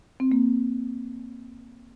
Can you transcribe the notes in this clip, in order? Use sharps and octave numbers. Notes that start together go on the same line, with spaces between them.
C4
A#3